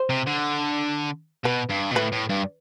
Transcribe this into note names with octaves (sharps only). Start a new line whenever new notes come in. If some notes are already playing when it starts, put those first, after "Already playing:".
Already playing: C5
C3
D3
B2 B4
G2
B2
A2 B4
A2
G2